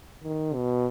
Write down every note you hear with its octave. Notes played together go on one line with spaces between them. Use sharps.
D#3
B2